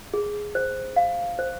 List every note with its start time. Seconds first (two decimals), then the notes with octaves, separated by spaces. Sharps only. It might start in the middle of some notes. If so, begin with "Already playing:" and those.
0.14 G#4
0.55 C5
0.96 F5
1.39 C5